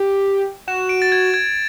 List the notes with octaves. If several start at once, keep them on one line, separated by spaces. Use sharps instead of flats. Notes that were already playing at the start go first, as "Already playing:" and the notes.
Already playing: G4
F#4 E7
D7
A6
G#6
G#6